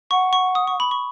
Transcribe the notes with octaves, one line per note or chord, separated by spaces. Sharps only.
F#5 C#6
C#6
D#6
C#6
B5
C#6